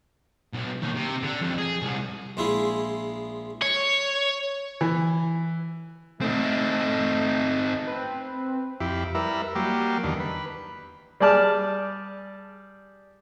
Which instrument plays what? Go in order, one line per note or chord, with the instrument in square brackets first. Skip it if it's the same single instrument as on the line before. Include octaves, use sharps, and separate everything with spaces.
[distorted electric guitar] B1
D#2
C3
D3
F2
G#4
C2
[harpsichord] A#1 G#3 E4 F4 G#4
[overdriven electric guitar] C#5
[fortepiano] E3
[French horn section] A3 [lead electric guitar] C4 D#4
[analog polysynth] C4 B4
[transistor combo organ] F2 E4 G4
G3 E4 A#4 B4 E5
F#3 G3 A#3 G4
E2 D3 D#3
B4
[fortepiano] G3 G#4 D5 A5 F6